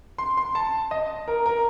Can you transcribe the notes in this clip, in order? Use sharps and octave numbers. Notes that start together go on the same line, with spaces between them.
C6
C6
A5
D#5
A#4
A#4